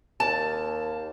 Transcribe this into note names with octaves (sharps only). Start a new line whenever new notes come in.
D#2 A5